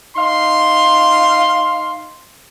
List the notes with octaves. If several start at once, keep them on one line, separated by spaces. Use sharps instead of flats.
D#4 F5 C6